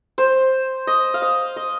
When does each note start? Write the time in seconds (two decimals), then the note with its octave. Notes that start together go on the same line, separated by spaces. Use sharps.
0.18 C5
0.87 D#5
1.14 F5
1.22 D#5
1.56 D#5